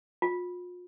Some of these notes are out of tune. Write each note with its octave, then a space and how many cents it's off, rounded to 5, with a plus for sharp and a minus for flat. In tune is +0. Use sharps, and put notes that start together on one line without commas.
F4 +40